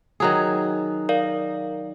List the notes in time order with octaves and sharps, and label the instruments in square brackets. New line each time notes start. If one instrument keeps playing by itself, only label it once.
[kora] D#3 F#3 G#4
[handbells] A#4 D5 F5